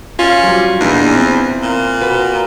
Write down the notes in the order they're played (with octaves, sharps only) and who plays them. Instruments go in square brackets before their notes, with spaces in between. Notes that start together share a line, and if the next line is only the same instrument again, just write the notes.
[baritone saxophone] C#4 [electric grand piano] F4
[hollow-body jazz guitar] F#3 G3
[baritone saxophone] E2 [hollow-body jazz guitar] A#2 D4 D#4
[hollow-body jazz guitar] C4 E4
[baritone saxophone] A#2
[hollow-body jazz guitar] F#4 B4 F#5